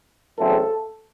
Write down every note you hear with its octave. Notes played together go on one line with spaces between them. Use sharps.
E2 C#3 F#3 A3 C4 A4